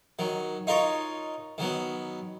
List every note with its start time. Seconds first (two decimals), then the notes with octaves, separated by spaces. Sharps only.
0.19 D#3 F#3
0.67 D#4 F4 A#4 C#5
1.58 D#3 F#3 B3